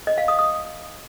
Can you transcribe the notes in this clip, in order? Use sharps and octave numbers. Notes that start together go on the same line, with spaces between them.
D#5
F5
D#6
D#6